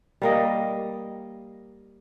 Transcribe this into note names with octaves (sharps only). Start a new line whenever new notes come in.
G3 A#3 D#5